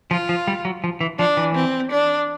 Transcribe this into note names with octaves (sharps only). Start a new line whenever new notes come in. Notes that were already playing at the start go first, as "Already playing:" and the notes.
F3 F4
F3
G3
F#3
F3
E3
F3 D4
E3
C4
D4